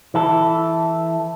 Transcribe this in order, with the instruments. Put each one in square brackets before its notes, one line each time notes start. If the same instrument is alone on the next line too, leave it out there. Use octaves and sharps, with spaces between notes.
[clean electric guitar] E3 E4 A4